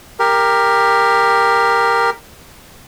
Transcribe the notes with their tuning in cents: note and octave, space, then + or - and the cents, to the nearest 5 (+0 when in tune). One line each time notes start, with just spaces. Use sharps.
G4 +15 A#4 +0